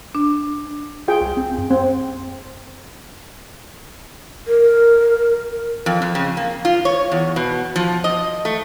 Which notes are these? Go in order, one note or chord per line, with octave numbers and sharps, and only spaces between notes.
D4
F4 G#4 G5
C2
C4
F#2
C4
A#4
F2
F2
C#3
A#3
F4
C#5
E2
B2
F3
D#5
A3